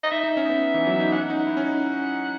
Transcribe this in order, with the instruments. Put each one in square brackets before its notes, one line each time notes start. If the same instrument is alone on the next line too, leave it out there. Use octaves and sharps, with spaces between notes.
[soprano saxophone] D#5
[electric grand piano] D#4 [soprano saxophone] E5
[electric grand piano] D#4
C#4
B3
E3
F#3
D#4
[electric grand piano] C#4 [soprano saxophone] F#5
[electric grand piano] D#4
E4
C#4
D#4